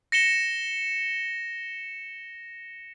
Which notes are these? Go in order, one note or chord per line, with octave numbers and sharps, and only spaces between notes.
A#6 C#7 E7 G7